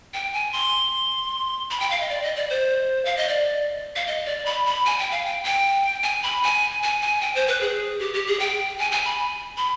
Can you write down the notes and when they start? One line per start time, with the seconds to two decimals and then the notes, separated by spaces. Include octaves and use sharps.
0.14 G5
0.33 G#5
0.53 C6
1.71 B5
1.80 G5
1.90 F5
2.00 D#5
2.09 D5
2.23 D#5
2.36 D5
2.49 C5
3.05 F5
3.17 D#5
3.29 D5
3.96 F5
4.07 D#5
4.26 D5
4.46 B5
4.66 B5
4.86 G#5
4.99 G5
5.11 F5
5.25 G5
5.44 G5
6.03 G#5
6.23 B5
6.43 G#5
6.83 G#5
7.02 G#5
7.21 G5
7.35 C5
7.47 B4
7.61 G#4
7.99 G4
8.14 G4
8.27 G#4
8.40 G5
8.79 G#5
8.92 G#5
9.05 B5
9.57 B5